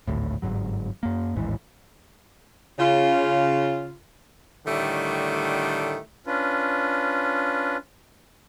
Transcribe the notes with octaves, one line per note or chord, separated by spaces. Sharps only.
G#1 D2 A2
G1 E2 G#2 F#3
F#2 A#3
A1 D#2 G#2 E3
C#3 F4
A2 D3 D#3 G3 A3
C#4 D4 F4 B4